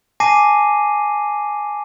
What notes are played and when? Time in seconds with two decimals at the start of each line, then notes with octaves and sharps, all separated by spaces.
0.20 G#5 A5 D6 A#6 C7 D#7